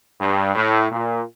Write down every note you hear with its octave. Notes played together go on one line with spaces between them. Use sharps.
G2
A2
A#2